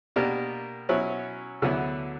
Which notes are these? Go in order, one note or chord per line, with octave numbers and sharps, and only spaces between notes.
B2 A#3 D4 G4 A#4
B2 F#3 C#4 E4
D2 D3 F#3 B3 E4